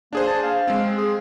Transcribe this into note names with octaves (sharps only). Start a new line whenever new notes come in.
A#3 D4 G#4 C5
A5
F5
G#3 C4
G#4